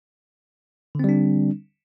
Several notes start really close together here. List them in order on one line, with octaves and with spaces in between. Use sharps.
D3 C4 G3 D4